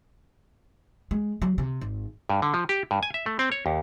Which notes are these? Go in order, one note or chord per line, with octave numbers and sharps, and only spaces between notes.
G#3
F#3
C3
G#1
G2
D3
F3
G4
G2
G#5
E5
A3
C4
C#5
D#2